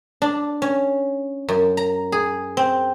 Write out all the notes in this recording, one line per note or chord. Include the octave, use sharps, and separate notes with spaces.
D4
C#4
F#2
A#5
G#4
C4